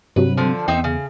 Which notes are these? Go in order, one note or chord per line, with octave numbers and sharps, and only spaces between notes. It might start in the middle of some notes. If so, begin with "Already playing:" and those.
G2 C3 F#3 B4
D3 F3
E2 C4 D#4 E5
C#3